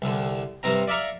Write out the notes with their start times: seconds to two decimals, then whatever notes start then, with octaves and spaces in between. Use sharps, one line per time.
0.02 C2 D3
0.63 G2 C3 C4 A#5
0.88 D5 E5 F5 A#5 C#6